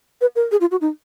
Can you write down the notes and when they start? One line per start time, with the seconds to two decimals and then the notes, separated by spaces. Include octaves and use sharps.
0.21 B4
0.36 A#4
0.51 G#4
0.61 F4
0.71 F#4
0.81 D#4